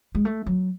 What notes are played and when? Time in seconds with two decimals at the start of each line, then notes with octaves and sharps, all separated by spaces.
0.15 G#3
0.25 A3
0.46 F#3